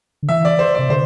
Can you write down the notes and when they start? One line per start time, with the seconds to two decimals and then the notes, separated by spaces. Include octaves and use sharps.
0.23 D3
0.29 E3 E5
0.45 D5
0.59 C5
0.75 C3 D5
0.90 D3 C5